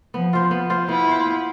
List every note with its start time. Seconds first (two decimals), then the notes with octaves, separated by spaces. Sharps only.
0.14 F3 B3
0.33 F4 C5
0.51 B3
0.70 F4 C5
0.88 B3 E4
1.07 F4 C5
1.26 B3